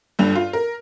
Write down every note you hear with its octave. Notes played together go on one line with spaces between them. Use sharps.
G1 G2 F7
F4
A#4